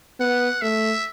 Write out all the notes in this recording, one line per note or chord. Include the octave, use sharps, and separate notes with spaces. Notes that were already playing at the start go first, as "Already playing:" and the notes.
B3 F#5
A3 E5